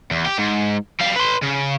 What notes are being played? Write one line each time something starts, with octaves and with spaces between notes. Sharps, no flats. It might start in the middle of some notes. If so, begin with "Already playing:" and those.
E2
G4
G#2
G3 F5
B4 C6
C#3